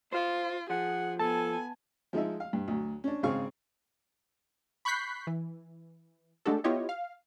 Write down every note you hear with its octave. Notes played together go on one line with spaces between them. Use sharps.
F4 C5 F5
F3 G#4 F#5
B3 A4 G#5 A5
F3 G#3 D#4 E5
F5
G2
D2 F#3
C#4 D4
G#1 C#3 C4 G#4 F5 C#6
B5 C#6 F#6 G6 B6 C7
E3
G#3 A3 D4 F#4 G4 A4
B3 E4 F4 G4 C#5 D#5
F5